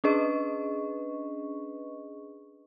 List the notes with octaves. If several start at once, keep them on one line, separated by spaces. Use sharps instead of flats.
C#4 D4 G#4 B4 D#5 C#6